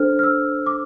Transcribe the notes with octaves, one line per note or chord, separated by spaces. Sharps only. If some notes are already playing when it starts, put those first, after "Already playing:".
Already playing: D4 A4 C5 F6
F6
E6
D6